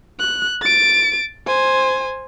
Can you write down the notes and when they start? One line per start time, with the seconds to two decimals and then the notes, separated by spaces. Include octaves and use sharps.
0.19 F#6
0.62 A6 D7
1.47 C5 G#5